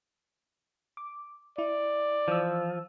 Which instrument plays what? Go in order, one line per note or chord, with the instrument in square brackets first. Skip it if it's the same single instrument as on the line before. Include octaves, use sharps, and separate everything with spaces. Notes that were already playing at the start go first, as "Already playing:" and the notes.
[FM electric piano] D6
[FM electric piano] E4 [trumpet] D5
[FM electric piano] E3 E6 [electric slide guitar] F3